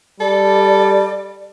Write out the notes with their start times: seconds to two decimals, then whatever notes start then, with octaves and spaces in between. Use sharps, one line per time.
0.20 G3 A4 D5